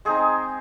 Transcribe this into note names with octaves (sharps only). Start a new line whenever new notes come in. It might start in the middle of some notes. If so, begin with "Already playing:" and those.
G#3 C4 D#4 G#4